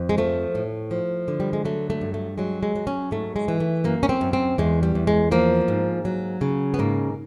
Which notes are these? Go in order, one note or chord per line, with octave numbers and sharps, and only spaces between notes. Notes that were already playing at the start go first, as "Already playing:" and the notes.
Already playing: F2
G#3
F3 A3
A2
F3
D3
G3
G#3
F#3 A3
A3
G2
A3
F#3 G#3
G#3
F#3
C#4
G#2 A3
G#3
E3
A3
F#2 A#3
C#4
C4
F#2
C4
E2 G#3
G3
E2
G#3
F3 A#3
G#2
F#3
C#3
B3
G#2 A#3